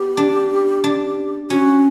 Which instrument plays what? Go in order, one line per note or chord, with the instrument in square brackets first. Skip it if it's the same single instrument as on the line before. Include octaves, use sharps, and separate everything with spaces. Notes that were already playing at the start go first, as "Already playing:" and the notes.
Already playing: [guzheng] B3 [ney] G4
[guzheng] D4
D4
[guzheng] C#4 [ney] F#4